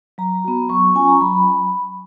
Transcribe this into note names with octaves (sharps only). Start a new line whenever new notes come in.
F#3 A#5
B3 F#4
F#3 C#6
C#4 F4 G#5
A#5
F#3 B5